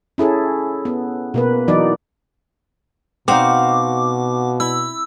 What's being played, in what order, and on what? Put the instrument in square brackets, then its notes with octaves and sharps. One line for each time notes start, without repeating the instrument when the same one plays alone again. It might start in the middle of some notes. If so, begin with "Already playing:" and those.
[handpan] C#4 E4 G#4 A4
B3
B2 A#3 B4
E3 F#3 D#4 D5
[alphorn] B2 [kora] C4 D#4 [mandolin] F#4 F5 [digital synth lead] D6
[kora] E4 [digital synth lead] E6